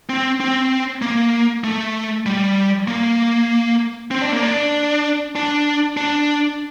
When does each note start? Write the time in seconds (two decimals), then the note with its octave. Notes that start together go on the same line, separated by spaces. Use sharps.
0.09 C4
0.40 C4
1.02 A#3
1.64 A3
2.26 G3
2.88 A#3
4.11 C4
4.22 D4
4.32 A#3
4.43 D4
5.35 D4
5.97 D4